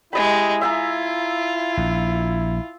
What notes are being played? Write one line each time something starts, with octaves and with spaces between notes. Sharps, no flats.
G#3 E4 G4 D#5 B5
F4 E5 G#5 A#5
A#1